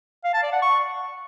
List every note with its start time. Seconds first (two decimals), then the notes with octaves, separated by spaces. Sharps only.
0.24 F5
0.34 A5
0.43 D5
0.53 F#5
0.62 C#6